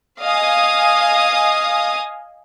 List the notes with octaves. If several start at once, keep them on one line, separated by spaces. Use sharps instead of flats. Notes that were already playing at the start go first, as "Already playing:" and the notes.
D#5 F5 G#5 D#6